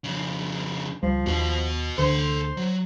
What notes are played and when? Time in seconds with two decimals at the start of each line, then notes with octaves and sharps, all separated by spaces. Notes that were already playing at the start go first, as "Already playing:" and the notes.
0.04 F2 C#3
1.03 C#2 F3 G3
1.27 D#2 F#4 B4
1.98 D2 D3 A4 C5 C6
2.57 F#3